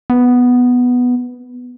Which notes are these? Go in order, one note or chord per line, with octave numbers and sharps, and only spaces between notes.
B3